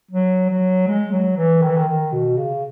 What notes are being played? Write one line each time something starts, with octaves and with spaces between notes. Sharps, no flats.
F#3
F#3
G#3
F#3
E3
D#3
E3
D#3
D#3
B2
C#3